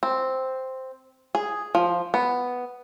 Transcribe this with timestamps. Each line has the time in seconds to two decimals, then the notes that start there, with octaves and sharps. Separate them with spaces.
0.03 C4
1.35 G#4
1.75 F3
2.14 B3